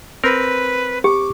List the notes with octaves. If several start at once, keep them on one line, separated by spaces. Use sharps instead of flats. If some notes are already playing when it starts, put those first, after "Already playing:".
C4 A#4 B4
G4 D6